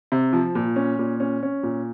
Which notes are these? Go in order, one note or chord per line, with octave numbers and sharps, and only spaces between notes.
C3
F3
A#2
C#4
A#2
C#4
C#4
A#2